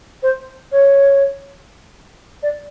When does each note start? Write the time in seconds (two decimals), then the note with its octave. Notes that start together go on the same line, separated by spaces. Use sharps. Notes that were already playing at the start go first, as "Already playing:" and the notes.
0.22 C5
0.71 C#5
2.42 D5